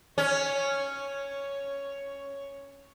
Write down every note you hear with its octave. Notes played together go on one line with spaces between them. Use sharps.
C#4 C#5